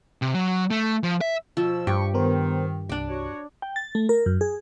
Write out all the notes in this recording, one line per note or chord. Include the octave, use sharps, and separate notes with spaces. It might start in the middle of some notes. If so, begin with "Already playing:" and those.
C3
F#3
A3
F3
E5
B2 F3 E6
G2 G4 C#6
D#3 B3 A#4 C5
C2 D4 D6
F#4 C#5
G5
A6
A3
A#4
F#2
G#4